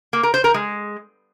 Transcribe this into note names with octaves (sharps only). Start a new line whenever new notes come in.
A#3
A#4
C5
A#4
G#3